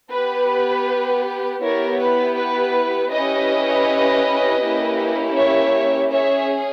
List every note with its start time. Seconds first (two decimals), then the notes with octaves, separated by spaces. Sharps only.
0.11 B3 G4 B4
1.61 B3 E4 G4 A#4 C#5
1.99 B4
2.37 B4
3.11 C#4 E4 G4 B4 D#5
4.61 A#3 C#4 E4 G4
5.35 C#5 E5
6.11 C#4 G#4 C#5 E5